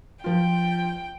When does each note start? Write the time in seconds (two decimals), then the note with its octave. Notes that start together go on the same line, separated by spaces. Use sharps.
0.24 F3 F4 G5